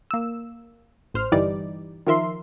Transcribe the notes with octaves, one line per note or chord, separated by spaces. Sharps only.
A#3 E6
A1 C5 F6
G1 E3 G3 D#4 D5
D#3 F3 A#4 E5 C6